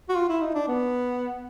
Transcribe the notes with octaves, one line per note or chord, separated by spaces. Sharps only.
F#4
F4
E4
D#4
D4
B3